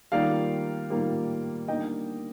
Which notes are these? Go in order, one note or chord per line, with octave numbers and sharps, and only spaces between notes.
D#3 G3 A#3 F4 D5 F5
D#3 G3 A#3 F4
D3 G3 A#3 D#4 D#5 G5